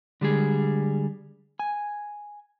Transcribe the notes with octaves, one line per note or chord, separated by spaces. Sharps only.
D3 G3 G#3 G#4
G#5